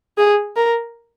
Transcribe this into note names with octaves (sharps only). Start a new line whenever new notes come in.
G#4
A#4